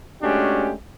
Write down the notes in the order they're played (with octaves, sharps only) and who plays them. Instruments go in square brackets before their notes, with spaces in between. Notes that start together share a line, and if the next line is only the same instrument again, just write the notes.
[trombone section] G#3 A3 C#4 D4 F#4 G4